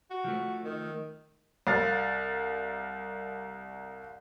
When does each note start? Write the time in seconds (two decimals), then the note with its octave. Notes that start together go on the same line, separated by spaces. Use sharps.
0.11 F#4
0.24 F3 A3
0.64 D#3
1.67 C2 F5 A6